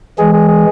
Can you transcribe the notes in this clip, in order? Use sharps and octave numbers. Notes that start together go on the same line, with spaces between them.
E3 G#3 G#4
G#4
G#4